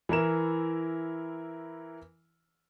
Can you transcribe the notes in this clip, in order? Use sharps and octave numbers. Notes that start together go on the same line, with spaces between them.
E3 E4 A#4 E7